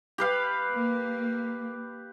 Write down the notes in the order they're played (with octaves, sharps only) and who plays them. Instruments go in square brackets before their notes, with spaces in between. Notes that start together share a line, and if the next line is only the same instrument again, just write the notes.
[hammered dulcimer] G4 B4 F5
[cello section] A#3